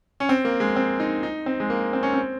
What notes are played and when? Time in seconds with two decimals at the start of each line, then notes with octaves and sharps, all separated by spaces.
0.20 C#4
0.29 C4
0.45 A#3
0.60 G#3
0.76 C4
1.00 D#4
1.23 D#4
1.46 C4
1.60 G#3
1.70 A#3
1.93 C4
2.03 C#4
2.14 C4